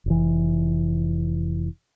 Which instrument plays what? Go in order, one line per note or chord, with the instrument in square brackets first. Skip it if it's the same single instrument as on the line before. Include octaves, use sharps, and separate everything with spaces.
[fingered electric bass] F1 E3